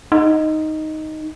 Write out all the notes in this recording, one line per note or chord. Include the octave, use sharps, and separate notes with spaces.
D#4